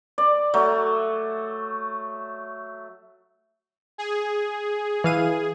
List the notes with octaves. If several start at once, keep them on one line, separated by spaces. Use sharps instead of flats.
D5
F#3 A3
G#4
E3 F5 D#7